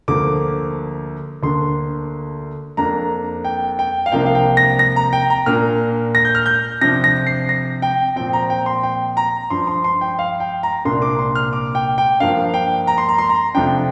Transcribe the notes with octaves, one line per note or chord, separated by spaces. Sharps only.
D2 D3 F3 A#3 D6
D2 D3 A#3 D4 C6
F2 F3 A#3 D4 A#5
G5
G5
F5
C2 C3 F3 A#3 D4 G5
F5
G5
A#6
A#6
A#5
G5
A#5
A#2 A#3 D4 F6
A#6
G6
F6
G6
C3 F3 D4 A#6
A#6
C7
A#6
G5
A#2 F3 C4 G5
A#5
G5
C6
G5
A#5
G2 F3 D4 C6
C6
C6
G5
F5
G5
A#5
C2 A#2 A#3 D4 C6
D6
C6
F6
D6
G5
G5
G2 F3 A#3 D4 F5
G5
A#5
C6
A#5
C6
A#5
F2 C3 F3 D4 G5